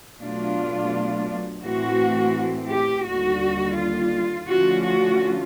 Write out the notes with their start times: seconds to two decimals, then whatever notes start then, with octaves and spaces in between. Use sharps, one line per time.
0.19 B2 F#3 A3 D4 F4
1.62 A2 E3 A3 C4 F#4
2.69 G4
3.05 D#2 D3 G3 F#4
3.76 F4
4.48 D3 F3 A3 C#4 F4 F#4
4.84 F#4